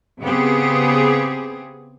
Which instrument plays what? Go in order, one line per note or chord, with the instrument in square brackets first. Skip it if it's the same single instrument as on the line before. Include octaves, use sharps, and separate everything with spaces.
[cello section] C#3 B3 C4 G4 G#4